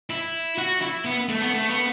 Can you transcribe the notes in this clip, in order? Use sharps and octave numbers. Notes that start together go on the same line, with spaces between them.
E4
F#4
E4
B3
A3
B3
A3
B3